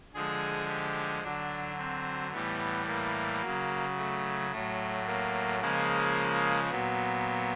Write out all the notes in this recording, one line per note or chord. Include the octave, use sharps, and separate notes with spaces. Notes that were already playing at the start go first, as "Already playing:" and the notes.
D3 F3 G#3 G#4
G4
D3 F#3 D4
C4
A2 E3 G3 B3
A#3
C#3 F#3
A3
A2 F#3 A3
A#3
C#3 F3 G#3 A#3
A#2 F#3 B3